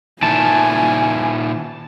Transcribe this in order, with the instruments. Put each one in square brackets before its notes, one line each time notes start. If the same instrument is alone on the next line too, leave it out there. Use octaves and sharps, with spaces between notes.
[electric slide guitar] A#2 D#3 E4 [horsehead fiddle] G#5 [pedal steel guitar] A5